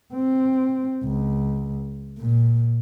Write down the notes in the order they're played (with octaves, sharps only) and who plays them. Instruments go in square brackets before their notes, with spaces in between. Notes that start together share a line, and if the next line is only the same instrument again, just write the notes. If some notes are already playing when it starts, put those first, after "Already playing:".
[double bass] C4
C#2
A#2